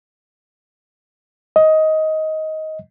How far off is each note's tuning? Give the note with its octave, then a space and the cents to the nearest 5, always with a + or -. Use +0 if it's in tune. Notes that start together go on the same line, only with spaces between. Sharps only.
D#5 +15